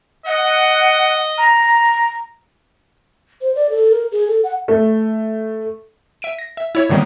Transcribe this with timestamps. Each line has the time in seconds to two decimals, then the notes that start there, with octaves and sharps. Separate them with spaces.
0.26 D#5 F#5
1.38 A#5
3.41 C5
3.55 D5
3.70 A4
3.91 A#4
4.12 G#4
4.28 A4
4.44 F#5
4.68 A3
6.22 E5 D7 D#7
6.39 A#6
6.57 E5
6.75 E4 C#5
6.90 A2 D3 D#3 G3 A#3 B3